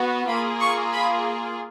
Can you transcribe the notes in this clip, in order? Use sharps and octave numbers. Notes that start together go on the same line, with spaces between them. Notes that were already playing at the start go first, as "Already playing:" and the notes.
Already playing: B3 F#4
A#3 F4 G#4 B5
C#6
B5